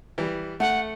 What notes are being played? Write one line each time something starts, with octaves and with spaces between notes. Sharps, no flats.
E3 G3
A3 F#5